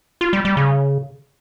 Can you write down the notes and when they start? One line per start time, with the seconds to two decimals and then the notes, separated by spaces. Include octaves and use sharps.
0.21 F4
0.33 G3
0.45 G3
0.57 C#3